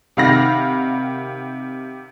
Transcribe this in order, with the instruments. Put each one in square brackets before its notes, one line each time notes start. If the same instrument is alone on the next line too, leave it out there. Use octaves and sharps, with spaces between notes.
[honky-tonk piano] C3 D#3 F5 F#5 B5 A#6